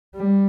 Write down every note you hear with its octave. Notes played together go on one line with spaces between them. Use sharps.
G3